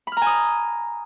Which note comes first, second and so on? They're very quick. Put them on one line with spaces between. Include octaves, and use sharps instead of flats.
B5 F6 A#5 G#5 D#6